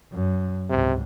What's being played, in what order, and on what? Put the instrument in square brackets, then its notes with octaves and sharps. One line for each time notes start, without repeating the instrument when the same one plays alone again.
[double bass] F#2
[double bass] C#2 G#2 [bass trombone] C3